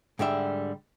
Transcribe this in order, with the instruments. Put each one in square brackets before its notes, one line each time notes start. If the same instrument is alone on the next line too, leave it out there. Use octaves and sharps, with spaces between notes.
[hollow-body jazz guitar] G#2 D3 G3 E5